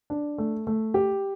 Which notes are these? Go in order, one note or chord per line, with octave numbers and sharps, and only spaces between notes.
D4
A3
A3
G4